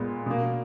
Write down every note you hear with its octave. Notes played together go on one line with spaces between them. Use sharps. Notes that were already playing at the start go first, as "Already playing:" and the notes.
Already playing: A#2 G#3 B3
B2 A#3